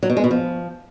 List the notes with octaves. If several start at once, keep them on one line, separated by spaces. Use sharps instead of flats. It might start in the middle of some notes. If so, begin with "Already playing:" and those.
F#3
B2
G#3
B2
F3